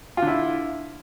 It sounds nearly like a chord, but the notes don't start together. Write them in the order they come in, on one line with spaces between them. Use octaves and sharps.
F4 D3 E4